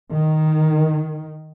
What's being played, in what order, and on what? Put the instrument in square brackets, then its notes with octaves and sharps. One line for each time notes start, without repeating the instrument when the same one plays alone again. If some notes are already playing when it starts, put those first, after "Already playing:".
[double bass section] D#3